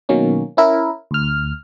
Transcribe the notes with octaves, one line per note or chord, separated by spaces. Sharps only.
B2 D#3 F#3 A#3 C#4
C#4 E4 A#4
D2 F6